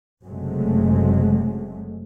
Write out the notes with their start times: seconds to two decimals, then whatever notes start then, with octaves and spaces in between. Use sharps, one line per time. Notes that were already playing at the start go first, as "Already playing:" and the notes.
0.25 F#1 C3 F#3 G#3 A3